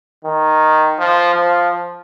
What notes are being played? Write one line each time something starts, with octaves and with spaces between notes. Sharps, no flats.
D#3
F3
F3